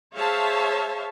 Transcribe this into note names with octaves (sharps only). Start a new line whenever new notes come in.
G#4 C5 C#5 E5 F5 A5